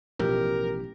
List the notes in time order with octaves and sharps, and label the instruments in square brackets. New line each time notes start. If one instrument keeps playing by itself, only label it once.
[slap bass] A1 [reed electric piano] B2 F3 [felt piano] G4 [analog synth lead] A#4